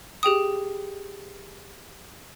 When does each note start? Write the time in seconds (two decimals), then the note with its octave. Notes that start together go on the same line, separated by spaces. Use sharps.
0.23 G4 G#4 G5 D#6